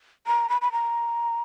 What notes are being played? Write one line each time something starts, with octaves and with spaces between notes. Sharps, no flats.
A#5
B5
B5
A#5